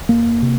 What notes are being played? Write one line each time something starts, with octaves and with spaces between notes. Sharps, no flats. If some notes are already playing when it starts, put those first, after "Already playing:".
F2 A#3
C3